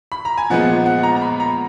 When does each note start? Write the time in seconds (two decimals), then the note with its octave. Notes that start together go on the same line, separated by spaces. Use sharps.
0.12 B5
0.25 A#5
0.37 G#5
0.50 A#2 F3 G#3 B3 F#5
0.86 F#5
1.03 A#5
1.16 A#5
1.22 B5
1.40 A#5